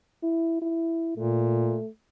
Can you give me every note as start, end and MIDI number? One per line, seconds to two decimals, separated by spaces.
0.23 0.61 64
0.61 1.14 64
1.17 1.79 46
1.17 1.88 57